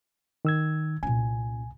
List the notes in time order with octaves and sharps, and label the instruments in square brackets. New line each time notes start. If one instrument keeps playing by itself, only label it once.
[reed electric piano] D#3 E6 G#6
[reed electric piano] C2 G#5 [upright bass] A#2 C#4